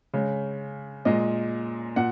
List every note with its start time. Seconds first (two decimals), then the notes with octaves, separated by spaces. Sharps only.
0.14 C#3 G#3
1.05 A#2 G#3 D#5
1.96 A#2 F#5